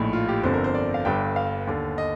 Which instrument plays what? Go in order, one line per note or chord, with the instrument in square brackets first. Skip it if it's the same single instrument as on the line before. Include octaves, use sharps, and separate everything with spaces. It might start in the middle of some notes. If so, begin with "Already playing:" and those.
Already playing: [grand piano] A#1 A2 D#4
F4
G4
G1 F2 D3 C5
A#4
C5
D5
F5
G1 G2 D3 G5
F5
D#2 D3
D#5